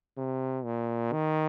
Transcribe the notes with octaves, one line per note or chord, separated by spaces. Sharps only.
C3
A#2
D#3